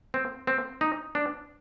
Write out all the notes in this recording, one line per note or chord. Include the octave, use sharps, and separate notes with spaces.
C4
C4
D#4
D4